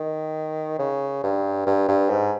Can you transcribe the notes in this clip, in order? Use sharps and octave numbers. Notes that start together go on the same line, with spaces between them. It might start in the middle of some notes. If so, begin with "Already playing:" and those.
Already playing: D#3
C#3
G2
G2
G2
G#2